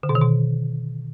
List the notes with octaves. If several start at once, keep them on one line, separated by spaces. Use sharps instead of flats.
D3
B2
D#3
B2